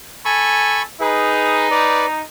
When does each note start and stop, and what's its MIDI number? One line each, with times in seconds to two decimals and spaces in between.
0.25 0.82 69
0.25 0.82 80
0.25 0.82 83
0.25 0.82 85
1.01 2.22 63
1.01 1.68 68
1.01 1.68 71
1.71 2.06 71
1.71 2.06 74